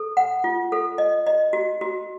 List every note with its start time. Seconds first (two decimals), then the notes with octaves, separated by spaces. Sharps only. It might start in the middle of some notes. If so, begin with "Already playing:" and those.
Already playing: A4
0.17 F#5
0.44 F4
0.72 A4
0.98 D#5
1.27 D#5
1.53 F#4
1.81 F#4